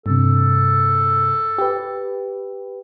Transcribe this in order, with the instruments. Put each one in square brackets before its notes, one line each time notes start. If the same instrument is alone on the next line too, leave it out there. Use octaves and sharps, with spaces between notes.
[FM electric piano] G2 C3 [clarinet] A4
[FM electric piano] G4 B4